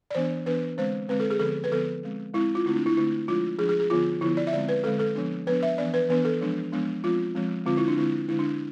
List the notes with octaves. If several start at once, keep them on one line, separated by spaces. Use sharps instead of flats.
D5
E3 B3 D4 C5
E3 B3 D4 B4
D3 G#3 C4 C5
D3 G#3 C4 B4
A4
G#4
D3 F3 B3 A4
B4
D3 F3 B3 A4
G#3 C4
G#3 C4 E4
F4
D3 A3 C4 E4
D4
E4
D3 A3 C4 E4
F3 G#3 D4 F4
F3 G#3 D4 G#4
G#4
G#4
D3 F3 B3 F4
D3 F3 B3 E4
D5
E5
D3 G#3 C4 D5
B4
D3 G#3 C4 A4
A4
F3 B3 D4
F3 B3 D4 B4
E5
E3 B3 D4 D5
B4
E3 B3 D4 B4
A4
F3 G#3 B3 D4
F3 G#3 B3 D4
F3 G#3 C4 F4
F3 G#3 C4
D3 G#3 C4 F4
E4
D4
D3 G#3 C4 E4
D3 G#3 D4 E4
D4